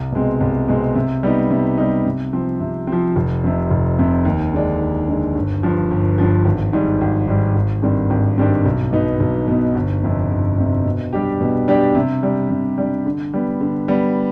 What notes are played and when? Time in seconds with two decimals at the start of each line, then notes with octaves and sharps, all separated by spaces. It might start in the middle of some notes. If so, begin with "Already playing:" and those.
Already playing: C2
0.12 B2 G#3 C4
0.41 C2
0.68 B2 G#3 C4
0.95 C3
1.23 G3 B3 D#4
1.51 C3
1.78 G3 B3 D#4
2.05 C3
2.33 F3 C4
2.60 C3
2.87 F3 C4
3.16 F1
3.44 F2 C3
3.71 F1
3.99 F2 C3
4.25 D#2
4.53 D3 G#3 D4
4.80 D#2
5.08 D3 G#3 D4
5.35 G1
5.63 G2 F3
5.91 G1
6.18 G2 F3
6.45 G#1
6.73 G#2 G3
7.01 G#1
7.28 G#2 G3
7.55 G#1
7.82 G2 D#3 G3 C4
8.10 G#1
8.38 G2 D#3 G3 C4
8.66 B1
8.93 B2 B3 D#4
9.20 B1
9.48 B2 B3 D#4
9.75 G1
10.03 F2 C3
10.31 G1
10.58 F2 C3
10.85 B2
11.13 G3 D4 G4
11.41 B2
11.68 G3 D4 G4
11.95 C3
12.23 G3 D4
12.50 C3
12.78 G3 D4
13.06 D3
13.34 G3 B3
13.61 D3
13.88 G3 B3